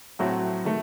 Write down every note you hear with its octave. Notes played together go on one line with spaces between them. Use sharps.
A2 F#3 A3 C4 F#4
D#3 A3